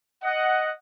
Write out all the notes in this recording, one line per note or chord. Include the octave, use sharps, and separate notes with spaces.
D#5 F#5